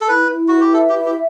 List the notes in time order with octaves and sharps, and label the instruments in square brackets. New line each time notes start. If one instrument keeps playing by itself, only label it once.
[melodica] A4
[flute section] E4 [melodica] B4
[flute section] E4
[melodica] F#4 [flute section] B4
[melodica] G4
[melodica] A4 [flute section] E5
[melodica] G4
[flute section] E4
[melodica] G4